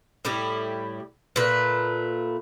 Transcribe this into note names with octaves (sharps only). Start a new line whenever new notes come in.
A2 G3 E4 G4
A#2 A3 B4